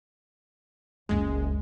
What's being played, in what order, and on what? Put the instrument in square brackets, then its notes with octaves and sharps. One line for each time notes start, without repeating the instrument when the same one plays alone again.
[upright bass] F#1 C#2 [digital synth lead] G#3